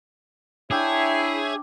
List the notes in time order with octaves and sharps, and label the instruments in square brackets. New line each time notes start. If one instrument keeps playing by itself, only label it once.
[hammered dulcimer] D4 G5 [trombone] E4 [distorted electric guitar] G#4 [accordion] C#5 E5